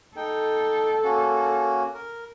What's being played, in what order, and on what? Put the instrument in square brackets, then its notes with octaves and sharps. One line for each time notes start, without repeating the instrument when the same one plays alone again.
[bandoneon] D#4 G5 [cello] A4
[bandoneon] A#3 C#4 F#4
A#4